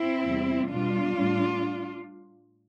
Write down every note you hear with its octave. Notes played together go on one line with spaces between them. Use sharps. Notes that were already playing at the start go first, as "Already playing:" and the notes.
Already playing: C4 E4
E2 C3 G3
B2 G3 D4 F4
A2 G3